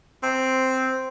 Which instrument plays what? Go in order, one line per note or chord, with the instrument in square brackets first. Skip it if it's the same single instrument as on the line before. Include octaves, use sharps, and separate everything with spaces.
[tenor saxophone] C4